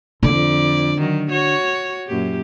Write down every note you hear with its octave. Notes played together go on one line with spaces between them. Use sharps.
F2 D3 D5
D#3 F#3
F#4 C#5
F#2 A#2 G4